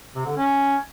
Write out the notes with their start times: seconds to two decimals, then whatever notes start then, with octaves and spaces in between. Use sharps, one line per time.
0.15 C3
0.26 D3
0.37 C#4